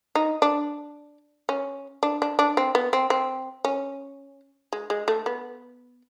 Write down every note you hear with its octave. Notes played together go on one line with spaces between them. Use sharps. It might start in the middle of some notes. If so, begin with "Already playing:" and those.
D#4
D4
C#4
D4
D4
D4
C4
B3
C4
C4
C#4
G#3
G#3
A3
B3